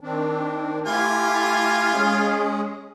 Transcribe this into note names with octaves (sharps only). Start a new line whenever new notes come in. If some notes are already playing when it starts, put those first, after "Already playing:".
D#3 C4 D4
A3 E4 F4 G4 G#5
G#3 C#4 G#4